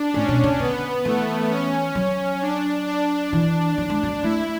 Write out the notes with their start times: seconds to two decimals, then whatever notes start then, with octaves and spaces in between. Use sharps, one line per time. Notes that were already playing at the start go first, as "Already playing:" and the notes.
Already playing: D4
0.14 A2 C#4
0.28 B2
0.44 C#3
0.60 D3 B3
1.05 E3 A3
1.50 C#4
1.95 F#3
2.42 D4
2.87 D4
3.33 E3
3.78 F#3
3.90 G#3
4.03 F#3
4.23 A3 E4